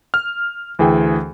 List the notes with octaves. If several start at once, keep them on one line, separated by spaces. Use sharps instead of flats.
F6
D2 E3 G#4 G5